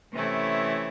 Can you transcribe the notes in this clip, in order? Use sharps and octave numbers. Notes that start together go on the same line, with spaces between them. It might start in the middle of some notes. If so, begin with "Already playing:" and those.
C3 E3 A3 C#4 E4